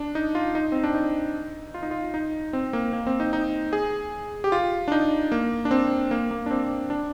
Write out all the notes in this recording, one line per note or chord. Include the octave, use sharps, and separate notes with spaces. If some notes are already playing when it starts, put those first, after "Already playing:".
Already playing: D4
D#4
F4
D#4
C4
D4
D#4
F4
D#4
F4
D#4
C4
A#3
A#3
C4
D#4
D#4
G#4
G4
F4
D4
D#4
A#3
D4
C4
A#3
A#3
D4
C4
D4